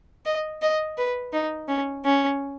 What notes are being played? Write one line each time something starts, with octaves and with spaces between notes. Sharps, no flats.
D#5
D#5
B4
D#4
C#4
C#4